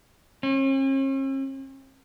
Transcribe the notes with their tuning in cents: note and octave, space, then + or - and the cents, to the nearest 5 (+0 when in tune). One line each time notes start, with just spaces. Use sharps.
C#4 -45